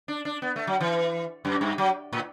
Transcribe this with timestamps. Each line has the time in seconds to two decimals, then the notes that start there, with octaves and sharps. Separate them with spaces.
0.08 D4
0.25 D4
0.42 B3
0.56 A3
0.67 F#3
0.81 E3
1.45 F#2
1.61 G2
1.78 F#3
2.13 A2